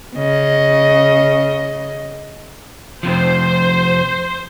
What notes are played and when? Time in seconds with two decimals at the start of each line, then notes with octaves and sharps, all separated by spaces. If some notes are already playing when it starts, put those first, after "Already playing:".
0.16 C#3 D#5
3.03 F2 C3 F3 C5